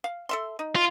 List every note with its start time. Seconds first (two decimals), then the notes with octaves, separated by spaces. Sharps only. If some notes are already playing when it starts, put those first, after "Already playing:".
0.04 F5
0.29 A4 E5 C6
0.59 D#4
0.75 F4